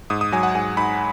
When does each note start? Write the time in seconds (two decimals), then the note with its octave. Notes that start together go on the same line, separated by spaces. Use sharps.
0.10 G#2 D#6
0.21 D#6
0.32 F#3 G#5
0.43 F#5
0.55 G#2 G#5
0.77 G#2 B5